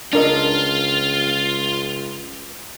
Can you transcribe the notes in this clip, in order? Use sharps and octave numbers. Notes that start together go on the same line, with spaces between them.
C#2 D4 F4 A#4 D#5